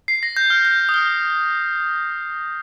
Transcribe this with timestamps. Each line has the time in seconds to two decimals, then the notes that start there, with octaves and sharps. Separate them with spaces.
0.08 C7
0.23 A#6
0.37 G6
0.50 F6
0.65 G6
0.80 G6
0.89 D#6
0.94 F6